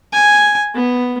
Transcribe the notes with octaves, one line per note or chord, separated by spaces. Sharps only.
G#5
B3